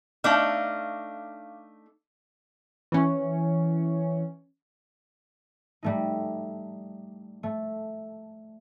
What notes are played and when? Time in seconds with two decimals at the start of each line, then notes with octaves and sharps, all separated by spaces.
0.24 A3 D4 D#4 F5 D6 F6
2.92 E3 C#4
5.83 G3 A3 D#4
7.43 A3